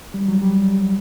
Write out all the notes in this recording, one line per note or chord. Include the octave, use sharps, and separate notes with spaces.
G3
F#3
G3